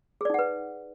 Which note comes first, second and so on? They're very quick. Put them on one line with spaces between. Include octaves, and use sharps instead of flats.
G#4 D5 D#4 F#5 B4